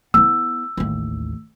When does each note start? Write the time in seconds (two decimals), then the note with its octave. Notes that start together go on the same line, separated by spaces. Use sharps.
0.14 B3 E4 E6
0.77 A1 D#2